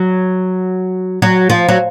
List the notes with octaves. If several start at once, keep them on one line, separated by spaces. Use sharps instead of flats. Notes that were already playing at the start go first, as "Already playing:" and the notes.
Already playing: F#3
F#3
F3
F#3